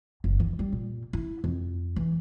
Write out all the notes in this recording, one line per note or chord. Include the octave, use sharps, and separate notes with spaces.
F#1
D#3
G3
A#2
E4
F2
E3